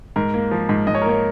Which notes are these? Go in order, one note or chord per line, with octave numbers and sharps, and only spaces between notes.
G#2 A#4
A#3
F3
G#2
G#2 D#5
C#5
A#4
A#3 C#5